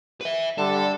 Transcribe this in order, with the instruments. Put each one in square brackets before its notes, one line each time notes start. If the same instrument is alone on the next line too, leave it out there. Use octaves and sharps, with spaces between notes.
[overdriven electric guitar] B4 E5
[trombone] D3 [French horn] G3 [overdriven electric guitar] A4